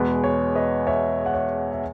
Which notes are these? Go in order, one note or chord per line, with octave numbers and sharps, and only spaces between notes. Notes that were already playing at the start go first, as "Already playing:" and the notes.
Already playing: E2 B2 G#3 B4
C#5
B4 D#5
C#5 E5
F#5
C#5 E5
E5